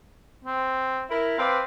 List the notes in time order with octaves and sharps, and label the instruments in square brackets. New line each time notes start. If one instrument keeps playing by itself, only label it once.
[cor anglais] C4
[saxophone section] E4 A#4
[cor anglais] C4 [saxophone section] B4 D5 F5